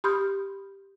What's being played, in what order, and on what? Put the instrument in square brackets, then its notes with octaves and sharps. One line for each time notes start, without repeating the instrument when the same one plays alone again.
[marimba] G4 B5 C6 D#6 F6 G6